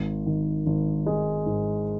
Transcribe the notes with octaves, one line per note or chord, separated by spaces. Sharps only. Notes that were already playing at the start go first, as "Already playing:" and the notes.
Already playing: G#1
D#3
G#1
G#3
G#2